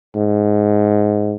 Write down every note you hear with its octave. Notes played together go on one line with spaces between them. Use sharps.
G#2